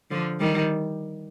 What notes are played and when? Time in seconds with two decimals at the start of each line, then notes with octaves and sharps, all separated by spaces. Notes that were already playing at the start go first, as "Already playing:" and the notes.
0.11 D3 F3
0.40 D#3 G3